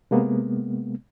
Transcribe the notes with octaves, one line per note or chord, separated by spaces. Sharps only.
C3 G#3 A#3 B3